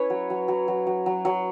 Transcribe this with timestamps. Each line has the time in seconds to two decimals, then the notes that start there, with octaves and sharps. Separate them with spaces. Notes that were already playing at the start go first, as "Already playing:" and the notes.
Already playing: C#4 E4 B4 C#5
0.10 F#3
0.30 F#3
0.48 F#3
0.68 F#3
0.87 F#3
1.06 F#3
1.25 F#3